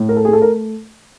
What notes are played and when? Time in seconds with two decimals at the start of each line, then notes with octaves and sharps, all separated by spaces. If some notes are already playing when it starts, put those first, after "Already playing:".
Already playing: A2
0.09 A#4
0.17 A4
0.25 G#4
0.28 A3 A4
0.42 A#4